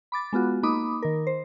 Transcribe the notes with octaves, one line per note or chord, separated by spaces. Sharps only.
B5 D6 A6
G#3 B3 F4 F#4
A#3 D#4 B5 D6 D#6
D#3 A#4
C5